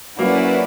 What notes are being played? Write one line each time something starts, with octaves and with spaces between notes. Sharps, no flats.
F#3 A#3 C#4 E4 B4 D5 F#5